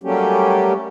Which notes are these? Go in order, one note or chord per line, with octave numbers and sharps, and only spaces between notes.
F#3 G3 A3 A#3 C#4 G4